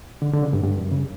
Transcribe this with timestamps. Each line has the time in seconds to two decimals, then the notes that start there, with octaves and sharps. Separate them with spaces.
0.22 D3
0.33 D3
0.43 C#3
0.53 G2
0.64 G2
0.78 F#2
0.92 C#3